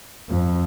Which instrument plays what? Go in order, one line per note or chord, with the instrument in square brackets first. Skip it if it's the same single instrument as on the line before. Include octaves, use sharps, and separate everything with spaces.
[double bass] F2